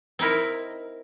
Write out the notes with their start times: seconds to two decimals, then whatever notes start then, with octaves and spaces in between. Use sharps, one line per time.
0.19 C4 D#4 E4 A#4